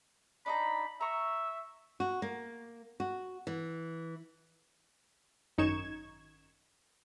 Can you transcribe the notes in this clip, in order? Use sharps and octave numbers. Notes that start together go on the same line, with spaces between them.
D4 D#4 A#5 B5
E5 A#5 C#6
F#4
A#3
F#4
E3
G#1 F#2 D#4 C#6 G#6 E7